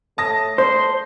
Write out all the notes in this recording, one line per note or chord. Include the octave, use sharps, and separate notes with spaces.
A3 A4 C#5 A5 D#6 A#6
C5 C6